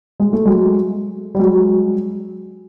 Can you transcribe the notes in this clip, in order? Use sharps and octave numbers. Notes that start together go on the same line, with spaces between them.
G#3
A3
F#3 G#3
G3
F#3 G#3